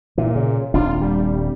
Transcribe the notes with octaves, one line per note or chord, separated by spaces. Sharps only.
A#2 E3
C#3
D#1 C4 D4 F4
G3